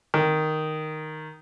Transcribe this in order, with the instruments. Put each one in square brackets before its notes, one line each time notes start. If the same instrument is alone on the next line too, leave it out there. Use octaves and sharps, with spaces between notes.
[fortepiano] D#3